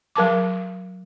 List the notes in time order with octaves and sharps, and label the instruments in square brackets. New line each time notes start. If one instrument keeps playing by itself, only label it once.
[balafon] F#3 A#4 A5 D6